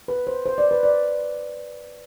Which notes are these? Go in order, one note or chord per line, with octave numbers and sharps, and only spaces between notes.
B4
C5
C5
D5
B4
D5